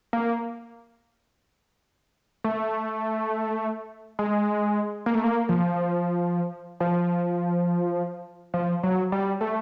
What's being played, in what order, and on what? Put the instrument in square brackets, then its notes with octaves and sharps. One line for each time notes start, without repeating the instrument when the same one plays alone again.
[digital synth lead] A#3
A3
G#3
A#3
A3
A#3
F3
F3
F3
F#3
G3
A3